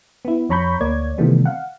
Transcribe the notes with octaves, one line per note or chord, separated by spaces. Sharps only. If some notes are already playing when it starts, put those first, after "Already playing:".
B3 E4
F2 C#5 A#5 B5 C#6 G6
D2 A#3 C#5 D5 G#6
C3 D#3 E3 G3 A3 B3
F5 F#5